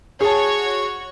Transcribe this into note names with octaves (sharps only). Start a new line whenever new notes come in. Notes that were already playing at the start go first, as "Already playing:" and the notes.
F#4 G#4 C#5 A5 C#6